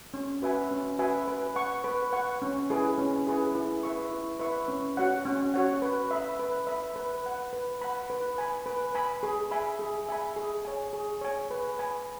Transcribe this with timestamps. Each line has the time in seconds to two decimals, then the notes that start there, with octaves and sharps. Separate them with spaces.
0.14 C#4
0.42 F#4 B4 E5 G#5
0.71 C#4
0.99 F#4 B4 E5 G#5
1.28 B4
1.56 F#5 C#6
1.84 B4
2.13 F#5 C#6
2.42 C#4
2.70 E4 G#4 B4 G#5
2.98 C#4
3.27 E4 G#4 B4 G#5
3.55 E4
3.83 B4 E5 C#6
4.11 E4
4.39 B4 E5 C#6
4.68 C#4
4.97 F#4 C#5 F#5
5.26 C#4
5.54 F#4 C#5 F#5
5.82 B4
6.11 E5 B5
6.39 B4
6.67 E5 B5
6.96 B4
7.24 F#5 B5
7.53 B4
7.81 F#5 B5
8.10 B4
8.38 G#5 B5
8.66 B4
8.95 G#5 B5
9.23 G#4
9.51 E5 G#5 B5
9.79 G#4
10.09 E5 G#5 B5
10.36 G#4
10.65 C#5 G#5
10.93 G#4
11.21 C#5 G#5
11.51 B4
11.79 G#5 B5